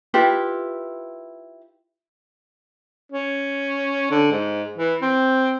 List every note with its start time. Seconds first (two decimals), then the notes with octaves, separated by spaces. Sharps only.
0.14 E4 F4 G4 B4
3.12 C#4
4.11 D3
4.32 G#2
4.78 E3
5.02 C4